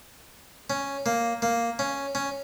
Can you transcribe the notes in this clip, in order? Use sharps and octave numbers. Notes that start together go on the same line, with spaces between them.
C#4
A#3
A#3
C#4
C#4